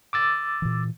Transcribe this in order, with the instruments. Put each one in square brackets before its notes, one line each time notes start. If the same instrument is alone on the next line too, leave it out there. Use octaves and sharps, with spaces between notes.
[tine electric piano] D6 E6 A6
[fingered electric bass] A#2 E3